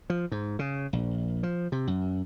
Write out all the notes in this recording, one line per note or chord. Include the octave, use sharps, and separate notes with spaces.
F3
G#2
C#3
A#1
F3
C3
F#2